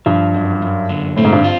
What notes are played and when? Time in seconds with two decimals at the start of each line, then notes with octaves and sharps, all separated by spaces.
0.06 G2 F3
0.34 F#2
0.62 F#2
0.89 D3
1.16 A2 C4
1.25 G#2
1.33 G2
1.44 F4